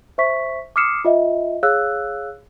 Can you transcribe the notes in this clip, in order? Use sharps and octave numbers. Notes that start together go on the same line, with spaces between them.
C5 E5 C#6 B6
D6 D#6 F6 C7 C#7 E7
F4 D#5 E5
G#4 C#5 F5 E6 F#6